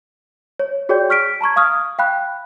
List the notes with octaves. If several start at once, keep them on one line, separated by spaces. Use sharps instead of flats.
C#5
F#4 G#4 C#5 D5 G5 G6
C#6 F6 B6 D7
A5 A#5 C#6 G#6
F5 C#6 D#6 F6
F5 G5 B5 F#6